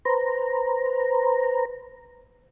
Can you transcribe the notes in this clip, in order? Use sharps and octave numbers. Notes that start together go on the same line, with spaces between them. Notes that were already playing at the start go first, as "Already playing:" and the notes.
B4 C5 A#5